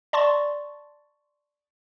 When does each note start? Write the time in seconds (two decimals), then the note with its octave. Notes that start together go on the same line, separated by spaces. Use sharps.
0.13 D5 A5 C6 C#6 A6